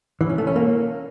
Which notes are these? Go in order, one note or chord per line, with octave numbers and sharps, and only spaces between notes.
E3
C#4
A3
C#4
A#3